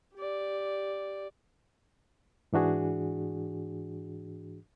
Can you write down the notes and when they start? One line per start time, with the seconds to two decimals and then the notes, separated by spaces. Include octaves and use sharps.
0.15 G4 D5
2.53 G#2 E3 D4 F#4 G#4